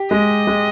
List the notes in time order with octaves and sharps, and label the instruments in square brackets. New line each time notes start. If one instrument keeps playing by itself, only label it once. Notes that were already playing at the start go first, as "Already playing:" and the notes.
Already playing: [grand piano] G4
[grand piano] G#3 [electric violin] D#5
[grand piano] G#3